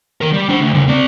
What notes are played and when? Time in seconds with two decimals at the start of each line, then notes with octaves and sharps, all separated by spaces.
0.21 D#3 A#4
0.33 G3
0.49 D4 C5
0.60 D2
0.74 C#3 G3
0.88 C4 D5